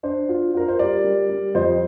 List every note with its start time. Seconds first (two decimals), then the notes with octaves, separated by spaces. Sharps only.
0.03 D4 C5
0.29 F4
0.54 F4 A#4
0.68 C5
0.79 G3 A#4 D5
1.04 G3
1.29 G3
1.55 F2 C5 D#5